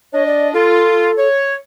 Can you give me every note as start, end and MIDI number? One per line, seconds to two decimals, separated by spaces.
0.13 0.51 62
0.13 0.23 73
0.13 0.51 75
0.26 0.49 74
0.54 1.12 65
0.54 1.28 69
1.17 1.55 73